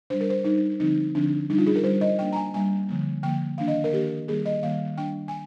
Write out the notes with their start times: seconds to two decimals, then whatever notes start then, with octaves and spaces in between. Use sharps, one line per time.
0.10 G3 D4 C5
0.21 A#4
0.30 C5
0.44 G3 D4 D#4
0.80 D3 F3 C4 D#4
1.15 D3 F3 C4 D4
1.50 G3 D4 D#4
1.58 F4
1.67 G#4
1.76 A#4
1.84 G3 D4 C5
2.01 D#5
2.19 G3 A#3 D4 G5
2.32 A#5
2.36 G#5
2.54 G3 A#3 D4 G#5
2.89 D3 F3 A#3
3.23 D3 F3 A#3 G5
3.58 D#3 A#3 D4 F5
3.68 D#5
3.84 A#4
3.93 D#3 A#3 D4 G4
4.28 D#3 G3 A#3 G#4
4.46 D#5
4.63 D#3 G3 A#3 F5
4.98 G3 D4 G5
5.28 G#5